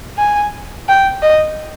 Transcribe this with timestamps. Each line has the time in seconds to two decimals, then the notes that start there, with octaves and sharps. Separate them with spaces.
0.18 G#5
0.88 G5
1.22 D#5